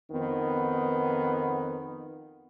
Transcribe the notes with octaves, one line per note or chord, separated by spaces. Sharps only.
F2 D#3 B3